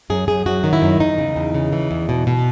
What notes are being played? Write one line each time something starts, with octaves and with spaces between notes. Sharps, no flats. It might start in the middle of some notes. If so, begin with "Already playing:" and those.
F#2 G#4
F#2 G#4
F#2 F#4
D#3
E4
F#2
E2 D#4
C#3
E2
C#3
E3
E2
B2
B2